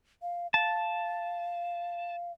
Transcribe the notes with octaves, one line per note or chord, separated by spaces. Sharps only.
F5
F5 A5